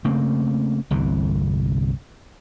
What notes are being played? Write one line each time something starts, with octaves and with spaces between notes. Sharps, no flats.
C#3 A3 A#3 C4
G1 C2 C3 E3